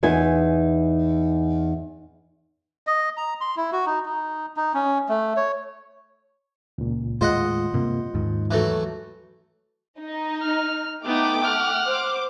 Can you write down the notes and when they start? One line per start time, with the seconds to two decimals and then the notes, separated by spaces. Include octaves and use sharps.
0.03 E2 D#4 B4 G#5
2.87 D#5
3.17 A#5
3.41 C6
3.57 E4
3.72 F#4
3.86 D#4
4.05 D#4
4.57 D#4
4.74 C#4
5.09 A3
5.37 C#5
6.78 C#2 A#2
7.21 D#2 A2 G#3 F4 C5 D#5 F#5
7.74 G2 C3 A#3
8.14 D#2 G#2 D#3
8.51 E3 F#3 A3
10.00 D#4
10.41 F6
11.05 A3 B3 D#4 G5 D6
11.44 F#5 F6
11.87 C5 D6